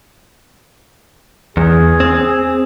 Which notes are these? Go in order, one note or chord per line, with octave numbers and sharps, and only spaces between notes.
E2 G#4
C4